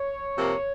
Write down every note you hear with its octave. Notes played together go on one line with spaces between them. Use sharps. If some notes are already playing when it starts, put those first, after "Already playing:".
Already playing: C#5
C3 F3 A#3